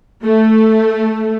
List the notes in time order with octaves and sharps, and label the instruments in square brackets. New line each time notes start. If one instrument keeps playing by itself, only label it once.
[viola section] A3